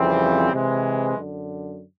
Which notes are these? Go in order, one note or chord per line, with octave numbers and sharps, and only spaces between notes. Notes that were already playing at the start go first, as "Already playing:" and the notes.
Already playing: F2 C#3 E3 G3 C4
C3 E3 G#3
F#2 D3